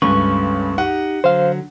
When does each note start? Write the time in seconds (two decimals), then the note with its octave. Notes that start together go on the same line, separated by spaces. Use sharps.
0.02 C#2 G2 A3 C#4 B4 C#6
0.78 D#4 G4 F#5
1.24 D3 F#3 C5 F5